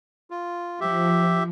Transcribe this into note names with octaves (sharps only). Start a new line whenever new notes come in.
F4
F3 G4 E5